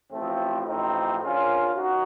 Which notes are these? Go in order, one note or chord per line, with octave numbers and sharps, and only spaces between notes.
A1 A2 F3 A3 C4
A1 A2 F3 C4 D#4
A#1 A#2 F3 C#4 F4
D#2 D#4 F#4